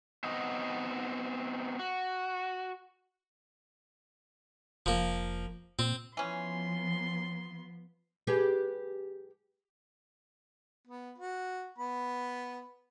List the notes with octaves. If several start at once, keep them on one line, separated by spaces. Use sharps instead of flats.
B3 C4 D#4 F#4 D#5
F#4
F1 F3 A#3
A#2 C4
E3 F3 B3 C#4 C6
G4 G#4 B4
B3
F#4
B3 B5